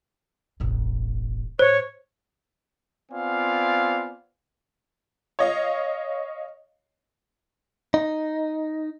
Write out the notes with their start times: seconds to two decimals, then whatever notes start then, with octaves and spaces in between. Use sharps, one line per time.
0.60 E1 A1
1.59 A2 C5 C#5
3.12 B3 C4 F4 D5 F5 G#5
5.39 C#5 D#5 F5
7.94 D#4